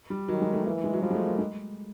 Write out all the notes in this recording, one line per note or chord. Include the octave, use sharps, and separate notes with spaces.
G3
D#3 F#3
G#3
A3
E3 A#3
G#3
F#3
F3 G3
G#3
A3
A#3
G#3